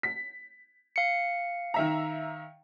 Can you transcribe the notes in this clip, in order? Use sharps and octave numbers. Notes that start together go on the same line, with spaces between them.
B6
F5 C#7
D#3 E5 A#5